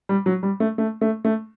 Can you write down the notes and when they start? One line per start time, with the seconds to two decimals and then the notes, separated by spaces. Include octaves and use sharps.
0.09 G3
0.26 F#3
0.43 G3
0.60 A3
0.78 A3
1.01 A3
1.25 A3